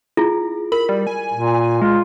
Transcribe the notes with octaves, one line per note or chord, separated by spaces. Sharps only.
E4 F4 G#4
A#4 B5
G3
G#5
A#2
G#3 F4